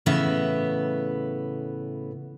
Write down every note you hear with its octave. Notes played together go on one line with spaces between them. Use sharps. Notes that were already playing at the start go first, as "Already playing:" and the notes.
A2 C#3 E3 B3 E5